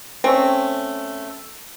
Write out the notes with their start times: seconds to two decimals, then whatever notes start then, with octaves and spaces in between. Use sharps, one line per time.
0.24 A3 C4 C#4